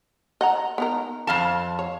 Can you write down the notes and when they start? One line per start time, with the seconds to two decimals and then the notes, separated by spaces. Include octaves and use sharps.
0.41 D#5 F#5 A#5
0.78 B3 D#4 A#4
1.27 F2 F5 A5
1.79 C#5